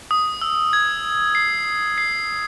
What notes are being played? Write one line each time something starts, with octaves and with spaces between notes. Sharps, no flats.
D#6
E6
G#6
C7
C7